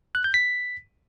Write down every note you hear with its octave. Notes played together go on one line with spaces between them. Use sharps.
F#6
G6
B6